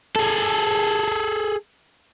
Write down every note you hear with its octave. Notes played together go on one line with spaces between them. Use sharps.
G#4 A4